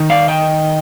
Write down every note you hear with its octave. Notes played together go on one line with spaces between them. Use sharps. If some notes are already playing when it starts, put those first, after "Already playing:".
Already playing: D#3 D#4
D5 F5
D#5 G5